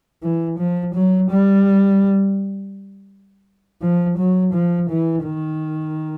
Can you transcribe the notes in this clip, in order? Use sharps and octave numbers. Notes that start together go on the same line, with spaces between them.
E3
F3
F#3
G3
F3
F#3
F3
E3
D#3